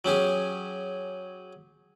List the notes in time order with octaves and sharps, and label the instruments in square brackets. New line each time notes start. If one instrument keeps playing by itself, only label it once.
[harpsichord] F#3 C#4 G4 G#4